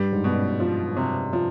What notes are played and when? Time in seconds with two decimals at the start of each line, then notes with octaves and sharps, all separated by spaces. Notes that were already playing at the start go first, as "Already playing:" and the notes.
Already playing: G2 G3
0.12 G#2
0.24 G2 B2
0.36 F#2
0.60 F3
0.97 C3
1.33 F3